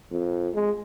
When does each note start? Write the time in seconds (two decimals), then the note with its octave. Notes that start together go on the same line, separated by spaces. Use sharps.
0.11 F2
0.54 G#3